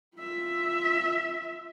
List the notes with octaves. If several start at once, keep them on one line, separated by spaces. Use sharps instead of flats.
F4 E5